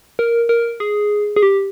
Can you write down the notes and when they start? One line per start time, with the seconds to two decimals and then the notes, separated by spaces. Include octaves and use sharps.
0.19 A#4
0.49 A#4
0.80 G#4
1.36 G#4
1.43 G4